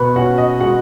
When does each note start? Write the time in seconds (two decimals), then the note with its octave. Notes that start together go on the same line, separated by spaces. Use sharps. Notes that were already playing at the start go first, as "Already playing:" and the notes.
Already playing: B2 B4 B5 C#6
0.16 C#4 F#4 F#5
0.38 D#5
0.60 G#3 F#4 F#5